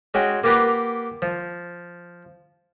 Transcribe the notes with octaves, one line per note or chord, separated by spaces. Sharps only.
G#3 C#4 F#4 G5
A#3 F4 G4 A#4 B4 F#5
F3